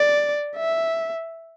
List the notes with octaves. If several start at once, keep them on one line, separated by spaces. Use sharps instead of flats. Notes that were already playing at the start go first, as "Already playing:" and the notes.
Already playing: D5
E5